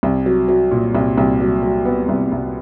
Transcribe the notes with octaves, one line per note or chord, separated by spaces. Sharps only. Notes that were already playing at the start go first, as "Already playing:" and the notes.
C2
F#3
F#3
A#2
C2
C2
F#3
F#3
B3
C2
C2